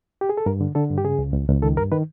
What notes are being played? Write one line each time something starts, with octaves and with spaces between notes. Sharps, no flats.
G4
G#4
A4
G2 A#4
D3
D3 A4
G2
G4
C#3 G#4
C#2
C#2
C#2
D#3 A4
G2 A#4
D#3 B4